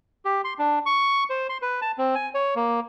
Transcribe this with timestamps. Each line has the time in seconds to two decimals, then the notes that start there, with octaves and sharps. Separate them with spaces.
0.25 G4
0.44 C6
0.59 D4
0.86 C#6
1.30 C5
1.49 C6
1.62 B4
1.82 A5
1.98 C4
2.15 G#5
2.34 C#5
2.56 A#3